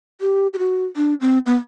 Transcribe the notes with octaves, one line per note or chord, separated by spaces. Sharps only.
G4
G4
F#4
D4
C4
B3